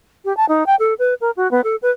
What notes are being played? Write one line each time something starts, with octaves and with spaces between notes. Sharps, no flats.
G4
A5
D#4
G5
A4
B4
A#4
F#4
B3
A4
B4